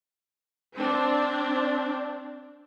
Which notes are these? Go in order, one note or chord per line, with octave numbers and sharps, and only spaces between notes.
C4 D4